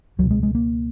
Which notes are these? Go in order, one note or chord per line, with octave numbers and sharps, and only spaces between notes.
C#2 B2 F#3
G#3
G#3
A#3